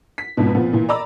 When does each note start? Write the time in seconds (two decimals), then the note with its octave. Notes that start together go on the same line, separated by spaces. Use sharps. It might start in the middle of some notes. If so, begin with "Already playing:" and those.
0.18 B6
0.37 G#1 F2 G#2 B2
0.55 A#2 F3 B3 C4
0.73 A#2 E3
0.89 D5 D#5 A#5 B5 D6 E6